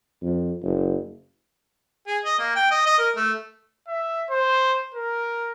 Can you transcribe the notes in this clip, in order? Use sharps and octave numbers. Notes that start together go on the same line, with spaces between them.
F2
F#1
G#4
D#5
A#3
G5
D#5
D#5
A#4
A3
E5
C5
A#4